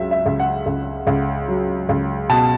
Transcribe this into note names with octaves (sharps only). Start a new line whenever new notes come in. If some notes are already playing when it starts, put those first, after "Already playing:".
Already playing: C#2 F#3 E5
E5
C#2
F#5
C#2
C#2
F#3
C#2
B2 A5